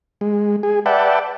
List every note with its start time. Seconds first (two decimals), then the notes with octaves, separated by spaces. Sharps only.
0.21 G#3
0.63 G#4
0.86 B4 D5 E5 F#5 G5 A5